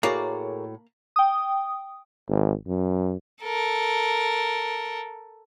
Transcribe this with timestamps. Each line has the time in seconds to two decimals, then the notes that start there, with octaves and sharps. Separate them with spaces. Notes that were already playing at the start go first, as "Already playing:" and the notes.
0.03 A2 A#3 F#4 G#4 A#4 C#5 D5
1.16 G5 D#6
2.28 G#1
2.67 F#2
3.43 A4 A#4